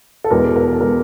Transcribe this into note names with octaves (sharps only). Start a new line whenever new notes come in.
A4
E2 B2 G#3 A#4
A#4
A4
B2 G#3 A#4